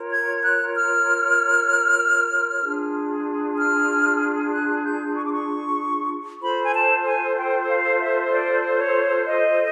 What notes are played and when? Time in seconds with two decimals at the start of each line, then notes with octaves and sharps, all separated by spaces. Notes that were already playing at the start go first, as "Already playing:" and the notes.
Already playing: F4 A#4 C#5
0.11 G#6
0.42 F#6
0.74 F6
2.63 D4 F4 G#4
3.58 F6
4.52 F#6
4.83 G6
5.15 C#6
5.24 D6
5.32 C#6
6.41 F4 A4 C5 B5
6.62 G#5
6.74 A5
7.05 G#5
7.35 G5
7.68 F5
7.99 E5
8.31 D5
8.77 C#5
9.26 D#5